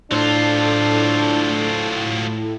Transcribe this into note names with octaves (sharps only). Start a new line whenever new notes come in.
A2 F#3 D4 F4 A4 C5